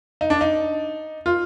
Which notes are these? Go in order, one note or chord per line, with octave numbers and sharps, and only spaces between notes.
D#4
D4
D#4
F4